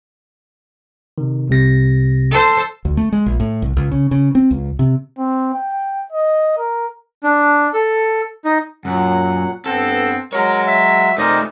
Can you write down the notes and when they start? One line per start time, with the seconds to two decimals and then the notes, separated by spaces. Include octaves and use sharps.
1.18 C3 D#3
1.49 C2 C3 A#6
2.31 A4 C5
2.85 D2
2.97 A3
3.13 G#3
3.26 A#1
3.40 A2
3.62 C2
3.77 C#2
3.91 C#3
4.11 C#3
4.35 C4
4.51 C#2
4.79 C3
5.19 C4
5.54 G5
6.13 D#5
6.58 A#4
7.23 D4
7.74 A4
8.45 D#4
8.85 F#2 A#2 F#3 F#5
9.66 G2 B3 C4 A4 F#5
10.33 F#3 G#3 F#4 A#4 C#5
10.67 E5
11.18 A3 D#4 A#4 C5 D5 D#5